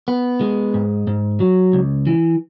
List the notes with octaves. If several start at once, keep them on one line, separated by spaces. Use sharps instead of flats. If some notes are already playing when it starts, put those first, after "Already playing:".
B3
G#3
G#2
G#2
F#3
C#2
E3